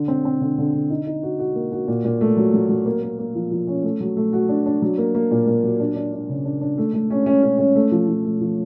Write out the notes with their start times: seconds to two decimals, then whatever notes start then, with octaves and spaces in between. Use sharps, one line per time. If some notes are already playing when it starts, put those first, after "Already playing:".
Already playing: D3
0.08 C4
0.25 C4
0.41 D3
0.58 D3
0.74 D3
0.90 D#4
1.07 D#4
1.23 F#4
1.39 F#4
1.55 A#3
1.72 F#4
1.88 A#2
2.05 A#2
2.21 A3
2.37 F#3
2.54 F#3
2.69 F#3
2.86 A#3
3.02 A#3
3.19 A#3
3.35 F3
3.51 F3
3.67 C#4
3.84 A3
4.01 F#3
4.17 A3
4.33 F#4
4.49 D4
4.66 D4
4.82 F#3
4.98 A#3
5.15 A#3
5.31 A#2
5.47 A#2
5.63 F#3
5.80 D4
5.96 D4
6.13 D4
6.29 C#3
6.45 D4
6.61 D4
6.78 A3
6.94 A3
7.10 C#4
7.26 C#4
7.43 C#4
7.59 C#4
7.76 A3
7.92 F3
8.08 F3
8.25 A3
8.41 F3